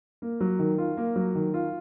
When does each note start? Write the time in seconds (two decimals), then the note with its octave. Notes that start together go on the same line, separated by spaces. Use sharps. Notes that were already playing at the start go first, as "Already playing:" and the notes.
0.22 A#3
0.40 F#3
0.59 D#3
0.78 F4
0.97 A#3
1.16 F#3
1.35 D#3
1.54 F4